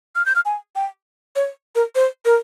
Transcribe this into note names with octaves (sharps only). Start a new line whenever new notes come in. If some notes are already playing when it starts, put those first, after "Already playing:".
F6
G6
F6
G#5
G5
C#5
A#4
C5
A#4